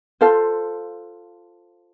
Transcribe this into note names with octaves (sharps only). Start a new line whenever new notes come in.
F4 A4 C5 F5